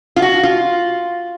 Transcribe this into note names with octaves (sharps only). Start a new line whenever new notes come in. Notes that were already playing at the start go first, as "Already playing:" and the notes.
F4
F#4
F4